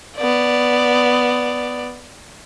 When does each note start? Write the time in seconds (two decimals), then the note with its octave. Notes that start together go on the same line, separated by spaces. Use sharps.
0.17 B3 D5